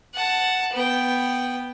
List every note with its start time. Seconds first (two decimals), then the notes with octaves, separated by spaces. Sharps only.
0.15 F#5 A5
0.73 B3 G5